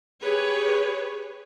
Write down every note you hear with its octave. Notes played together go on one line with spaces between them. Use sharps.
G4 G#4 B4 C#5